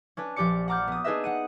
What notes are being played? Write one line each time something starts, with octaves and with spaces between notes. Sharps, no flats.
C#4 D4 B4
A#1 F3 G4 D5 D6 C#7
F#5 A#5 D6 F6 G6
B3 D#6
D4 D#4 G#4 B4 D#5 E5
B3 F#5 D#7